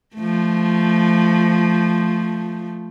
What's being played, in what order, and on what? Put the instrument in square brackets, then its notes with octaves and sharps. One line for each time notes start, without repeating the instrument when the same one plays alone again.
[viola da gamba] F3 A3